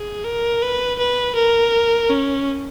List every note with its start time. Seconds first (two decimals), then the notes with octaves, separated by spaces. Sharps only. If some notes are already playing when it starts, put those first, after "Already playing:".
Already playing: G#4
0.25 A#4
0.63 B4
0.99 B4
1.35 A#4
2.10 C#4